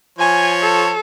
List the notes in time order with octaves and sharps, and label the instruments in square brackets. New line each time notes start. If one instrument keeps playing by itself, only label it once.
[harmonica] F3 C#5 [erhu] G#5
[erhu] A4